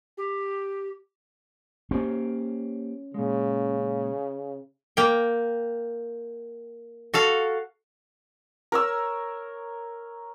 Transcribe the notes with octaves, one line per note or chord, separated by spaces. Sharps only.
G4
A#3 C4 C#4 G4 C5
A#2 C#3 G#3
A#3 G5
F#4 A4 F5
A#4 C#5 E6